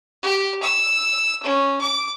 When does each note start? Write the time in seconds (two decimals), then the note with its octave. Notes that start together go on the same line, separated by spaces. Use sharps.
0.22 G4
0.62 E6
1.43 C#4
1.81 D6